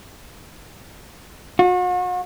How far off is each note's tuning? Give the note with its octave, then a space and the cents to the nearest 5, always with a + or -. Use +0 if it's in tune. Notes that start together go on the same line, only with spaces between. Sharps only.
F#4 -40